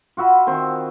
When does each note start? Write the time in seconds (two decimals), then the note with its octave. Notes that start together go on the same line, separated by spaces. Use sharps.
0.17 F4 F#4 E5 B5
0.47 D#3 C4